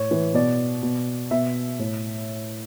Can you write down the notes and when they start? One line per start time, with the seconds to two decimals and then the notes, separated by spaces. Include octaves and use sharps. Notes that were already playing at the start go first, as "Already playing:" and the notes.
Already playing: A2 C#5
0.11 E3
0.34 B2 D5
0.83 B2
1.31 B2 E5
1.79 A2